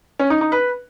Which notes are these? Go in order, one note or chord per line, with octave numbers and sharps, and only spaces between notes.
C#4
D#4
D#4
B4